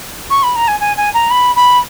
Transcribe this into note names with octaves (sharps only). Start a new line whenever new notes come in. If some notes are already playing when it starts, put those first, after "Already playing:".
C#6
B5
A#5
G#5
G#5
G#5
A#5
B5
B5